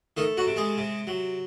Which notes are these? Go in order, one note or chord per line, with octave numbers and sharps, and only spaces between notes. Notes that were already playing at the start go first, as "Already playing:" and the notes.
D#3 A3 D#4
F#3 F#4
C3
G#3 G#4
C3
F#3